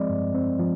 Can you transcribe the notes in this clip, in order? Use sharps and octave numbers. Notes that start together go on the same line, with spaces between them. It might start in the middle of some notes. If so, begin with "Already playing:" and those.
Already playing: F3 G#3 C4 D5 D#5
G2
C4
F3